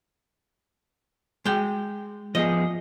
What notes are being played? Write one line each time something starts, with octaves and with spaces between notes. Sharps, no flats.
G#3 G5
F3 B3 G#4 D#5